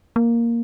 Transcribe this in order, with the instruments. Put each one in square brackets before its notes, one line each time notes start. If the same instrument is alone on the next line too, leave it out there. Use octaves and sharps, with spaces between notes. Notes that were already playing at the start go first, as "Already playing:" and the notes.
[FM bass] A#3